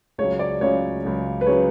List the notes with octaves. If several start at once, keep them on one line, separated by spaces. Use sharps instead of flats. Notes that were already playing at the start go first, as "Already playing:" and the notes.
C#2 C#3 F#3 C#5
D5
C#2 C#3 F#3 C#5
C#2 C#3 F#3
B4
C#3 F#3 C#5